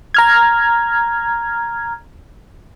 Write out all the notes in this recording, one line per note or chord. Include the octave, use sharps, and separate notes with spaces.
A#5 F6 G#6